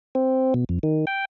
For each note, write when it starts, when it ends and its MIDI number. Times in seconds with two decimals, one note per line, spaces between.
0.15 0.54 60
0.54 0.64 47
0.69 0.79 41
0.83 1.05 51
1.07 1.25 79